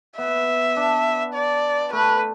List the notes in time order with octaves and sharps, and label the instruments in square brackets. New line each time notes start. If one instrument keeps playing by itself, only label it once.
[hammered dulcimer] B3 [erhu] E5
[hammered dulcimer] D4
[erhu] D5
[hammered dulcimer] A3 [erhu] B4